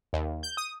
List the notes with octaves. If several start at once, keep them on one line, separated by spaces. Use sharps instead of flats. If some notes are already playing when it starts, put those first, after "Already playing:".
D#2
G6
D#6